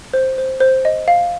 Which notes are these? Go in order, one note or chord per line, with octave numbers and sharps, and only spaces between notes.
C5
C5
C5
D#5
F5